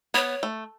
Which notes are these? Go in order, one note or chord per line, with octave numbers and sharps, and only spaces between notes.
B3 C#5
A3